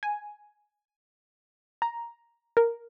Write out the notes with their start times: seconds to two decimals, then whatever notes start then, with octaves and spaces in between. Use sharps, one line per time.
0.03 G#5
1.82 A#5
2.57 A#4